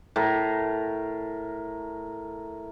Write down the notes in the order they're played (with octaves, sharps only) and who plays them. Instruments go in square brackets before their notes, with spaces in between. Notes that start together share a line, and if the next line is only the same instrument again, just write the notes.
[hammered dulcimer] A2 A#4